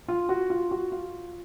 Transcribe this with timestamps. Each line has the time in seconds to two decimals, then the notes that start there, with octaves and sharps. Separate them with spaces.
0.08 F4
0.29 F#4
0.50 F4
0.71 F#4
0.92 F4